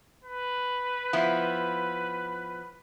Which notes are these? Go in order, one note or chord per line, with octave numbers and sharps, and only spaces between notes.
B4
F3 B3 E4